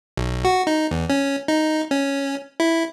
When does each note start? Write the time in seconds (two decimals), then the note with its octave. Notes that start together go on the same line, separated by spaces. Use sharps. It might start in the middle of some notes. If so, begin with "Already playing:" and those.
0.17 B1
0.45 F#4
0.67 D#4
0.91 E2
1.10 C#4
1.48 D#4
1.91 C#4
2.60 E4